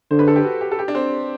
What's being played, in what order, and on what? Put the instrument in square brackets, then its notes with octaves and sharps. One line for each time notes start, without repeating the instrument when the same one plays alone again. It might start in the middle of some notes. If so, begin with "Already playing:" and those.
[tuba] D3 [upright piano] C5
[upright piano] B4
A4
G4
F#4
G4
A4
G4
D4
C4